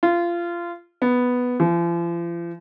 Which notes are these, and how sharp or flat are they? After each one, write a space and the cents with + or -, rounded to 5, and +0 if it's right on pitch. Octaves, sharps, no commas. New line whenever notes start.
F4 -20
B3 +0
F3 -40